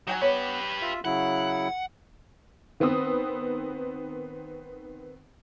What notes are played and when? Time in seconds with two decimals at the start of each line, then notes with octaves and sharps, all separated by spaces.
0.07 F#3 D#4 G5 G#5
0.21 B3 G4 B4 C#5
0.81 F4 E5
1.05 C#3 F#3 E4 F#5
2.80 D#3 B3 C4 D#6